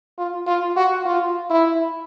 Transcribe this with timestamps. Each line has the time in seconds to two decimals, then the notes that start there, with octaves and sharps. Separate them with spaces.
0.18 F4
0.47 F4
0.76 F#4
1.05 F4
1.50 E4